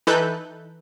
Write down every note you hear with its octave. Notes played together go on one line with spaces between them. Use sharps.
E3 D#4 A4 B4 F#6 G6